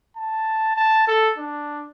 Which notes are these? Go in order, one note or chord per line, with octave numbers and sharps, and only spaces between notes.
A5
A5
A4
D4